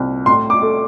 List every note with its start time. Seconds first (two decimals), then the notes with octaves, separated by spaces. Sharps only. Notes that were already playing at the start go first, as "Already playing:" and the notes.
Already playing: C2 A#2 G3
0.26 A2 C6
0.50 D6
0.62 A3